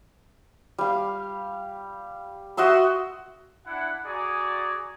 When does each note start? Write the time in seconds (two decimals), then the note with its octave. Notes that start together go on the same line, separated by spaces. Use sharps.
0.78 G3 F5
2.57 F#4 D#5 E5 C6
3.66 D4 E4 F#5
4.05 F#4 G#4 D5 A#5